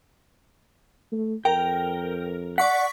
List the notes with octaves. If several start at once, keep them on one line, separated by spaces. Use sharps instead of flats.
A3
F2 A#4 G5
D5 F#5 C#6 B6